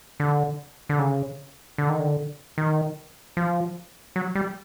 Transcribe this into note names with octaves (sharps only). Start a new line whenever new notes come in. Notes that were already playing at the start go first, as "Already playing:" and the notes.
D3
D3
C#3
D3
D#3
D3
D#3
F3
F#3
G3